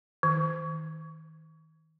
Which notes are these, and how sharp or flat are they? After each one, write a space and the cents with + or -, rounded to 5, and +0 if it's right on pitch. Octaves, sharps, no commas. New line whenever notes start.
D#3 +35